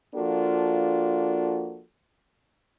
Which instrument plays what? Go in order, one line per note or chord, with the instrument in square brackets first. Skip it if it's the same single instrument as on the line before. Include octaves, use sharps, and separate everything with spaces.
[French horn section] F3 A#3 D4 F4 F#4 A4